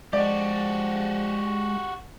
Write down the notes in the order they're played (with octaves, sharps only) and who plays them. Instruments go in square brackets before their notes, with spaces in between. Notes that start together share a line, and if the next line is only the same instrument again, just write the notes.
[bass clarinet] F3 [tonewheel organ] G#3 [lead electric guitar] F#4 G4 [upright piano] D5